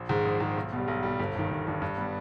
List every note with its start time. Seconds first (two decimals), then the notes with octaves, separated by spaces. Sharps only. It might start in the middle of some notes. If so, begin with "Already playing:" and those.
Already playing: A#1
0.09 G#2 D#3 G#3
0.25 A#1
0.40 G#2 D#3 G#3
0.57 B1
0.72 B2 G3
0.88 B1
1.03 B2 G3
1.20 G1
1.35 G2 D#3
1.51 G1
1.67 G2 D#3
1.82 G2
1.98 G3 B3